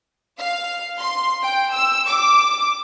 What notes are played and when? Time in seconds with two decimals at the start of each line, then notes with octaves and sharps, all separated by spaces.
0.39 F5
0.99 C6
1.43 G5
1.73 E6
2.08 D6